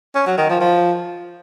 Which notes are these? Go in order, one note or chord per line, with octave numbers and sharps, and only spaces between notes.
C#4
F#3
D#3
F3
F3